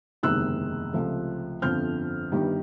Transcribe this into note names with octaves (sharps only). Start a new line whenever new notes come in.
F#1 E2 C3 D#3 G#3 E6 F#6
C#2 C3 F3 A3
G1 F2 D3 F3 F6 G6
G1 G2 D#3 G3